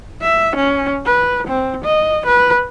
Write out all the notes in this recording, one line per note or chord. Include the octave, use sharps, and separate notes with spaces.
E5
C#4
B4
C4
D#5
B4